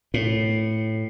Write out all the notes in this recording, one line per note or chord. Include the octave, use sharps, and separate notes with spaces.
A2